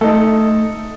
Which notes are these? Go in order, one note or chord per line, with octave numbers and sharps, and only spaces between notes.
A3 D#4 A4